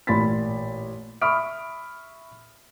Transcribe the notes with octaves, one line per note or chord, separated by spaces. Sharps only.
A1 A#2 B5 C6 A6 B6
E5 B5 C#6 D#6 F6 D7